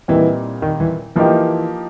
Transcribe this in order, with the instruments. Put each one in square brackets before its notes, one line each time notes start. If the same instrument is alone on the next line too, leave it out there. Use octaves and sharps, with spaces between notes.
[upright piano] A#2 G3 C4 D#4 [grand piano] E3
[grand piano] D#3
E3
[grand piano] E3 [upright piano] F3 A#3 D#4 G4